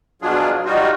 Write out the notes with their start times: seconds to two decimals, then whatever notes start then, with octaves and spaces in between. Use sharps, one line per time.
0.22 B2 F#3 D4 F4 G#4
0.65 G3 D#4 F4 F#4